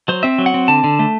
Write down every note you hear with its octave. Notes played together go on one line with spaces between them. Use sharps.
F#3 C5
C4 E5
F#3
F#5
C4
D3 A5
D3
A3